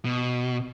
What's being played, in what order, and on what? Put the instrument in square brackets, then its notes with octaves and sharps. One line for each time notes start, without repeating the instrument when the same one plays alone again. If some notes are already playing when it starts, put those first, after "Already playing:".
[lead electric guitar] B2